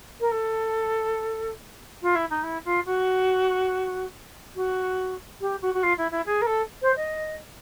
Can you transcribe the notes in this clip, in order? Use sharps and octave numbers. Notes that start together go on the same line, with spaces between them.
A#4
A4
F4
E4
D#4
E4
F4
F#4
F#4
G4
F#4
F#4
F4
E4
E4
G#4
A#4
A4
C5
D#5